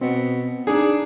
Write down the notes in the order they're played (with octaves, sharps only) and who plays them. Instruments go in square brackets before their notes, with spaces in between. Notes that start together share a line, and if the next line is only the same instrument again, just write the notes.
[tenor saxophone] B2 [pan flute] B3 [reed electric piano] C4
[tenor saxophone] D4 [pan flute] D#4 [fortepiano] G#4